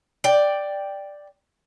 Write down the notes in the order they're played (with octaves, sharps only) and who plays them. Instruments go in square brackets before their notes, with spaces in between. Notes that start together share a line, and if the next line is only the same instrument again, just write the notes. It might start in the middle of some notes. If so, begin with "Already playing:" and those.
[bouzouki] D5 G5